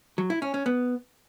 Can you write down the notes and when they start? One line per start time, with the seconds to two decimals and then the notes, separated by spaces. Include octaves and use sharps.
0.18 F#3
0.30 E4
0.42 C#4
0.54 C#4
0.66 B3